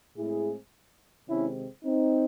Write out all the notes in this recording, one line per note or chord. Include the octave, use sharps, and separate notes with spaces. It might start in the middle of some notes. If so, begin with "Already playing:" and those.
A2 G#3 C4 E4 G#4
C3 D#3 G#3 C4 C#4 E4
C4 D#4